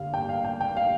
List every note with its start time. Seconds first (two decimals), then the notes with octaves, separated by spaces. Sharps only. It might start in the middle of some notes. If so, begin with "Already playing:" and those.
Already playing: G2 D3 F5
0.14 G5
0.29 F5
0.45 G5
0.61 G5
0.77 F5